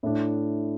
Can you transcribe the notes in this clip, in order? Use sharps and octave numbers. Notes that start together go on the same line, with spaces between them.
A2 A3 D4